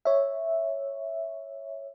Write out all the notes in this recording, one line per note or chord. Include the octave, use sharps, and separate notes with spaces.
C#5 E5